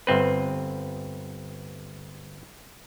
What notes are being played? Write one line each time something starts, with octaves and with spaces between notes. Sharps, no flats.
G1 C4 B4